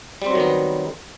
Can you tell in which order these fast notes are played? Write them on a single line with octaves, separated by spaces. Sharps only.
G3 C4 F#3 D#3 B3